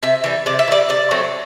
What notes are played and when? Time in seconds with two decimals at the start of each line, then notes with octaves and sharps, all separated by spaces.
0.03 C3 E5
0.24 E3 G3
0.46 C3 D5
0.59 E5
0.68 E3
0.71 G3 D5
0.89 C3 D5
1.11 F#3 A3 C4